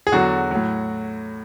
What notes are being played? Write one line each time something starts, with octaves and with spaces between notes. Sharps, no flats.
G#4
E2 D3 F#3 F#4
A2 F#3